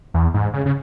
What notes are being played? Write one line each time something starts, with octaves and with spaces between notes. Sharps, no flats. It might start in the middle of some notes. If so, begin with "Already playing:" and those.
E2
G#2
C#3
C#3